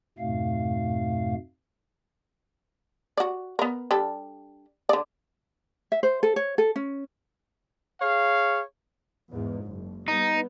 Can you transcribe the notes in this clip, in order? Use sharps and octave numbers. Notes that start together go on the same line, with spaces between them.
F2 G#2 B2 A3 F5
F#4 D5
B3 A#4
G3 D4 A4
D3 D5
E5
C5
A4
C#5
A4
C#4
G#4 C#5 F5
E2 G#2
F#1
G3 B3 D#4